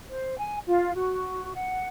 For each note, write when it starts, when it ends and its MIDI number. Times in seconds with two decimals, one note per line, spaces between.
0.09 0.37 72
0.38 0.57 80
0.66 0.93 65
0.94 1.52 66
1.55 1.87 78